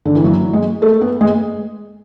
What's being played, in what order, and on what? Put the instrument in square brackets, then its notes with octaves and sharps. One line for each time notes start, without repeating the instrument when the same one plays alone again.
[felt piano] D3
E3
F#3
G#3
A3
B3
G#3